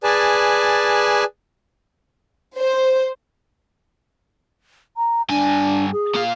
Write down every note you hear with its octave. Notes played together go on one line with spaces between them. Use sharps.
G#4 B4 D5 G#5 A5
C5
A#5
G2 D4 G#5
G#4
A#2 F5